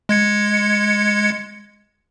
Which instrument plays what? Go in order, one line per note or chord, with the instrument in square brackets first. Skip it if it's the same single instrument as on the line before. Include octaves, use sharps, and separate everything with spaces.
[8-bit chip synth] G#3 G#6 C#7